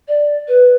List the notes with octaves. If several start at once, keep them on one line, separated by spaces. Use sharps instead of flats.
D5
B4